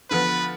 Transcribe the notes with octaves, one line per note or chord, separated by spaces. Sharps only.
D3 F3 B3 B4